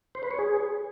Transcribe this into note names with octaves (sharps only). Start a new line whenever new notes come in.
C5
B4
C#5
G#4